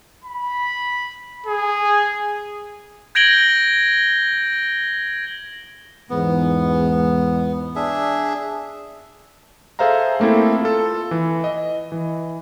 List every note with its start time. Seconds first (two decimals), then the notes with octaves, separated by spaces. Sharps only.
0.24 B5
1.47 G#4
3.15 G6 G#6 A#6 D7 F#7 G7
6.10 E2 G#2 B3
7.76 D4 G#4 E5
9.79 G#4 A4 C5 E5 F5 A#5
10.20 A3 A#3 C4 E4 A4
10.61 F4 A4
11.11 E3
11.44 D#5
11.92 E3